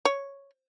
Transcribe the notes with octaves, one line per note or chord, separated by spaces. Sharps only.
C#5